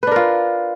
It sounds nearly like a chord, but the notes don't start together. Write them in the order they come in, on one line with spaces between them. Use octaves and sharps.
B4 D4 A#4 F4